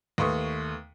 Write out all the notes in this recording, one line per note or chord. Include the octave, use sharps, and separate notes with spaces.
D#2 A3 B4 C6 C#6 D#6